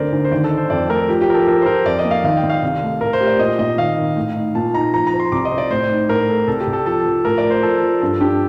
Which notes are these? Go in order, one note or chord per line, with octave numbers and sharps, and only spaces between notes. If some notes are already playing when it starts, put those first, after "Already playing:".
Already playing: D2 C4 A#4 C5 D5
D2
C5
D#2 D5
A4
D#4
C5
F2 D5
A3 A#4
A4
F3 G4
G4
F3 A#4
A4
F3 A#4
C5
F3 A#4
F2 D5
D#5
A#3
F5
D#2 F5
G5
D#2
F5
C2
A3
A2 A#4
C5
G4
D5
A#2 D#5
A#2 D#5
D#3 F5
D#3
A2
D#4
A#2 A5
D#4 A#5
F3 A#5
A#5
C5
C6
C2 D6
D#5
C4
D5
A2 C5
D#4
A2 A#4
A4
C2 A4
G4
C2
A4
F3 A4
F3
A2 A#4
D5
A#4
C5
F3 A4
F3
G2 A4
D4 G4